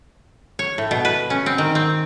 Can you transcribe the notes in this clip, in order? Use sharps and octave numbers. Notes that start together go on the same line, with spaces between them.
C#5
A2
B2
B4
C#4
C4
D#3
C4